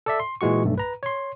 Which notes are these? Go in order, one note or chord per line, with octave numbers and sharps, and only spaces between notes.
A4 D5 E5
C6
A#2 E3 G#3 F#4 C#6
B1 G2 A3
B4 A#5
C#5 C6